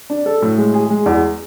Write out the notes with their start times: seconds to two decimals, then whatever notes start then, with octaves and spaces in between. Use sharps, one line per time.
0.10 D4
0.26 A4
0.42 A2
0.58 G#3
0.74 G#4
0.90 G#3
1.06 E2